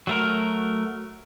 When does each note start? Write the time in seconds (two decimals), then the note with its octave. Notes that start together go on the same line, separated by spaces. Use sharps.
0.07 F#3 A3 A#4